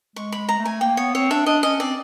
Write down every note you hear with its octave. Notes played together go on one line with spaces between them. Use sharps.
G#3 C#6
B5
G#3
A#5
A3
G#5
A#3 G5
B3 C#5
C4 C#5
D4 E5
D4 D#5
C#4 D#5
C4 D5